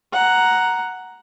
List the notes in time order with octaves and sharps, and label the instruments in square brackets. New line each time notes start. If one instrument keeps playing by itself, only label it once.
[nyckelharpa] F#5 A#5